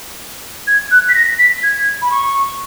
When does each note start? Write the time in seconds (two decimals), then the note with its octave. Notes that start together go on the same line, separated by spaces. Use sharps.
0.67 G#6
0.91 F#6
1.09 B6
1.15 A#6
1.39 B6
1.63 G#6
2.02 B5
2.11 C#6